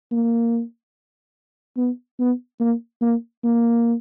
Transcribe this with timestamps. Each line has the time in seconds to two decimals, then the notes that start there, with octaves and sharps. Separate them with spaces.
0.12 A#3
1.77 B3
2.20 B3
2.60 A#3
3.02 A#3
3.44 A#3